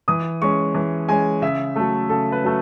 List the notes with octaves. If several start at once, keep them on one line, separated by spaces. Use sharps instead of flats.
E3 D#6
G#3 C#4 C#6
E3
G#3 C#4 G#5
C#3 E5
F#3 A3 A4
C#3 A4
B4
F#3 A3